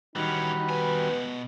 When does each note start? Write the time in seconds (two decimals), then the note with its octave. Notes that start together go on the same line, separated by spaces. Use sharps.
0.16 D#3 E3 G3 C#4 D#4 F#4 B5
0.69 B2 B4 G#5